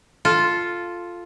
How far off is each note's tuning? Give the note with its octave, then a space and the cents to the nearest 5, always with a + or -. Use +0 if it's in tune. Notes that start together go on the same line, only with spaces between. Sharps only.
F4 +0 A4 -5